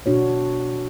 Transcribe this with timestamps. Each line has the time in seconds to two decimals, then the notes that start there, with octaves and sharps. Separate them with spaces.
0.06 B2 D4 F#4 C#5